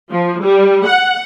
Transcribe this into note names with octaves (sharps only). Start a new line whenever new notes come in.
F3
G3
F#5